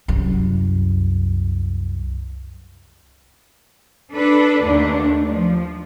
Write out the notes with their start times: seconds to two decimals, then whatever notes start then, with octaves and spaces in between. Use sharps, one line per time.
0.08 C2 F#2
4.13 D4 A4 B4
4.62 D#2 D3 A3 D4
5.28 F3